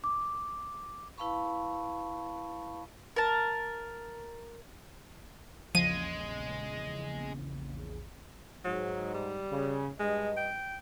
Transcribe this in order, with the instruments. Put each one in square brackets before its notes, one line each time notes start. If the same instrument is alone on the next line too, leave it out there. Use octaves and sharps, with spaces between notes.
[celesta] D6
[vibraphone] E4 B4 F5 A5 B5 C#6
[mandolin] A#4 A5
[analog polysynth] A#1 E2 C#3 [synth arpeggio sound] F3 [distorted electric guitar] G#3 [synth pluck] D#7
[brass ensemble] G#2 [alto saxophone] F#3
[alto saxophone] G3
[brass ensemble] C#3
[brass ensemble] G2 D#5 [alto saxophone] G#3
[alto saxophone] G5